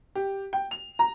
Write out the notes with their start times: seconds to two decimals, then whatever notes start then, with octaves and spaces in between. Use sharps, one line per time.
0.15 G4
0.53 G5
0.71 F7
0.99 A#5